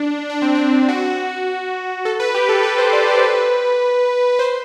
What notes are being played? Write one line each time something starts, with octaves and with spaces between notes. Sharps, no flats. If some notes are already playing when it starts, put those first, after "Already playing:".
Already playing: D4
D4
C4
D4
F#4
A4
B4
G4
A4
B4
C5
D5
C5
B4
C5